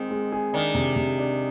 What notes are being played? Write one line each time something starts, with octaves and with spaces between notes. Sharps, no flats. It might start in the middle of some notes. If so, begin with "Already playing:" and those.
Already playing: D#3 G#3 C4
G#3
G#4
D#3 D4
C3
C3
D4